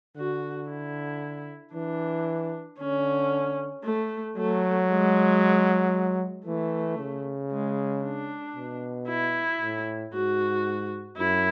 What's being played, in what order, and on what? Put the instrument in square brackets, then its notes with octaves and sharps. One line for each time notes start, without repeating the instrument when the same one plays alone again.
[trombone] D3 [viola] F#4
[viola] E4
[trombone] E3 [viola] D4
[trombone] D3 [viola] C#4
[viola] A3
[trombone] F#3 [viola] A3
[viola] G#3
[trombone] E3 [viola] A3
[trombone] C#3
[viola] G#3
D4
[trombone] B2
[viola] E4
[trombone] A2
[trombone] G#2 [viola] F#4
[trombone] F#2 [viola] E4